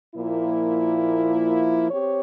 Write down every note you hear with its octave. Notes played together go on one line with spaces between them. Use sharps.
A#2 F3 A#3 E4
C4 G4 C#5